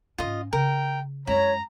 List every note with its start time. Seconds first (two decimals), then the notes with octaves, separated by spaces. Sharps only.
0.18 G#2 C#4 F4 D#5
0.53 C#3 A#4 G5
1.27 F#2 G#3 E4 C#5 A#5